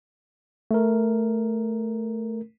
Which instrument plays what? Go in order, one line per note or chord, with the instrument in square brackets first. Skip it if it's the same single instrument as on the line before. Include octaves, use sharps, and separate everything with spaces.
[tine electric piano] A3 A#4